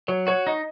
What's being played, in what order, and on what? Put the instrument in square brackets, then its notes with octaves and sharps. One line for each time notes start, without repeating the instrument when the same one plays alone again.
[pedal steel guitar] F#3 [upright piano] C#5
[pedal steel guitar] F#4 [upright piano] C#5
[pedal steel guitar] D#4 [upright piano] D#5